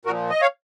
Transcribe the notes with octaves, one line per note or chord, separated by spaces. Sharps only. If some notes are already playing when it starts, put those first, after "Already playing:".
A#2 F3 F#4 A#4
D#5
C#5 F5